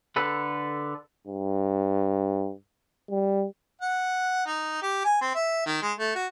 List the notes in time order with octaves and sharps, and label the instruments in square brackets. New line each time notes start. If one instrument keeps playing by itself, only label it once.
[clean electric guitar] D3 A4 B4
[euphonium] G2
G3
[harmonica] F#5
D#4
G4
G#5
C4
E5
D#3
G#3
A3
F#4